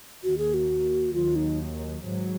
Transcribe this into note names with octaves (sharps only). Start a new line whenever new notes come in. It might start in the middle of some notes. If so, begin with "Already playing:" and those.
D#2 D#3 A#3 F#4
G#4
F#4
D#2 D#3 F#3 F4
D#4
G#1 G#2 F#3